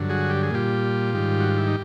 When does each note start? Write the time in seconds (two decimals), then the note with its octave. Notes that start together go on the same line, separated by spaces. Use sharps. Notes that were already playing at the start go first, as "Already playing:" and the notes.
Already playing: G2 D3 F#3
0.09 F#4 G#4
0.30 G4
0.43 G#4
0.51 A#2 G3 F4 G4
1.13 G#2 D#3 G3
1.40 F#4
1.49 F4
1.58 E4
1.67 D#4